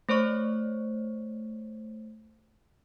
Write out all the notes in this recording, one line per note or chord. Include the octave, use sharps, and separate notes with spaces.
A3 C5 C#5 C#6